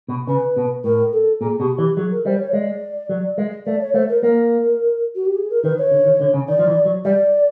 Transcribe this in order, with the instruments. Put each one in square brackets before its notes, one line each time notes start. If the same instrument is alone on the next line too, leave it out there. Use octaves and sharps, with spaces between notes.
[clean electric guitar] B2
[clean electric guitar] C#3 [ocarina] B4
[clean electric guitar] B2
[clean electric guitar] A2 [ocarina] A#4
[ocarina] A4
[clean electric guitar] A#2 [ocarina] G#4
[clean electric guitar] B2 [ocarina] G4
[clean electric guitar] E3 [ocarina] G4
[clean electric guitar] F#3 [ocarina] G#4
[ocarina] A#4
[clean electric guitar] G3 [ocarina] C5
[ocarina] C#5
[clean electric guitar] G#3 [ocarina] D5
[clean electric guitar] F#3
G#3
[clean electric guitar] A3 [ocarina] D5
[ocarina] C#5
[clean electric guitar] A3 [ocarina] C5
[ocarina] A#4
[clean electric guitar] A#3 [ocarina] A#4
[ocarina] F#4
G4
G#4
A#4
[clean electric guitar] D#3 [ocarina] B4
[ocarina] C#5
[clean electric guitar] D3
D#3
D3
C#3
[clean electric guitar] D#3 [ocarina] D5
[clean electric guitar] F3
E3
F#3
[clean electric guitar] G3 [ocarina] D5